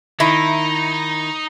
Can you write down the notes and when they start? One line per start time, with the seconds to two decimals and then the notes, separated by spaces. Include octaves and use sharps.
0.20 D#3 D#4 E4